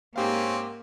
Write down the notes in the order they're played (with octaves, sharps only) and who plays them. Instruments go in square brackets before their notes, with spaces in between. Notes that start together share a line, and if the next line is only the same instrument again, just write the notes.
[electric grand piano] G#2 G4 F5 [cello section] A#3 [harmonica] C4 C#4